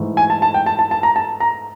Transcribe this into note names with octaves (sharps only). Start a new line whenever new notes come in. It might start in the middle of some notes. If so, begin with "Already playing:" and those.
Already playing: G#2 E3 A3
G#5
A5
A5
G5
A5
A5
A5
A#5
A5
A#5